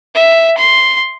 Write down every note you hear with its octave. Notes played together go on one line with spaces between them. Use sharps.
E5
C6